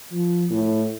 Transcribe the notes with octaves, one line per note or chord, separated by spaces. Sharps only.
F3
A2